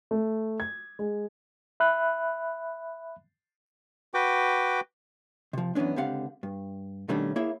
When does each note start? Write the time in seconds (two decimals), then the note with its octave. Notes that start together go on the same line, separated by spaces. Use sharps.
0.11 A3
0.60 G#6
0.99 G#3
1.80 E5 B5 F#6
4.14 F#4 B4 G5 D6
5.53 C3 F3
5.75 F#2 E3 G#3 B3 C#4 D4
5.96 C#2 D3 C4 G4 F5 F#5
6.43 G2
7.08 B2 D#3 G3 A3 C#4 D4
7.36 A#3 E4 G#4 C#5 E5